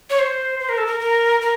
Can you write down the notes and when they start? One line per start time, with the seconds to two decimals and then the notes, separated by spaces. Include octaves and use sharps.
0.10 C#5
0.19 C5
0.60 C5
0.69 A#4
0.78 A4
0.87 A#4
1.00 A#4
1.41 A#4